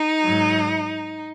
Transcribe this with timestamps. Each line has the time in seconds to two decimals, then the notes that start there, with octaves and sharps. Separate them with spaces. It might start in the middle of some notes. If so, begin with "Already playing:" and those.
Already playing: D#4
0.23 G#2 F#3